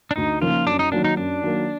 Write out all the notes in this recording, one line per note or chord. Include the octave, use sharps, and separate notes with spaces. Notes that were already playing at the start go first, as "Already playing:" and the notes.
D4
D2 D#4
C#3 F3 A#3 D#4 F4
F#2 D4
D#4
D#3 F#3 A#3 D4
D#4
F#2 D4
D#3 F#3 A#3